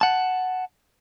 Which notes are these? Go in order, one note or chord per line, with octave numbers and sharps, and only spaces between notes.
F#5 A5